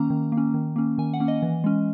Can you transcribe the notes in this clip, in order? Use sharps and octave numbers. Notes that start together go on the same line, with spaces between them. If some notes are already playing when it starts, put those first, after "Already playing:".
Already playing: D#3 A#3 C#4 A#5
D#3
A#3
C#4
D#3
A#3 C#4
D#3 G#5
F#5
A#3 C#4
D#5
E3
G#3 C#4